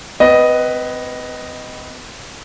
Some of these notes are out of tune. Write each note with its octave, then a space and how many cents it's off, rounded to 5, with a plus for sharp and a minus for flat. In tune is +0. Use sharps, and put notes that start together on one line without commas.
C4 -35 B4 +0 D#5 +0